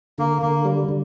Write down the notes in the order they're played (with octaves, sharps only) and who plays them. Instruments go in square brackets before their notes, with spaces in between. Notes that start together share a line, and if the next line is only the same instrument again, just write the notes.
[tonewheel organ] D3 [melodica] A#3
[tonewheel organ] D3 [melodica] A#3
[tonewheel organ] G3
D3